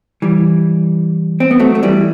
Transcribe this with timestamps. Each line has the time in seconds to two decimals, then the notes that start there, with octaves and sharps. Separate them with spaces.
0.22 E3 G3
1.40 C4
1.51 B3
1.59 F#3 A3
1.75 A3
1.83 E3 G3